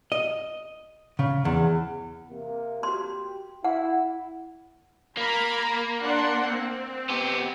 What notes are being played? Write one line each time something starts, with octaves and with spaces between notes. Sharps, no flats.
D#5
C#3
E2
C3 A#3
F#4 G4 C6
E4 F#5
A#3 A#5 B5
D4 F#5 C6
C4
B3 G4